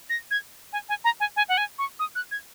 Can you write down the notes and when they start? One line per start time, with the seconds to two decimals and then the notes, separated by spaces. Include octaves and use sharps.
0.10 A#6
0.31 G#6
0.73 G#5
0.89 G#5
1.04 A#5
1.20 G#5
1.36 G#5
1.49 F#5
1.57 G#5
1.78 C#6
1.99 D#6
2.15 F#6
2.31 G#6